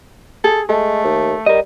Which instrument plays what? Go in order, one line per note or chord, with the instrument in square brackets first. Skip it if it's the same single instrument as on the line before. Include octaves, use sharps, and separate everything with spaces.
[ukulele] G#4 [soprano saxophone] A4
[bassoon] G#3 [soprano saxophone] A3 [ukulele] A4
[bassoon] D#2
[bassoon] G3 [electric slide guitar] A#4 D#5